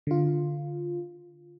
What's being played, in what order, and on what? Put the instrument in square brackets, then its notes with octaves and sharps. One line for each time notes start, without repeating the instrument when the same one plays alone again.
[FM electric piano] D3 F4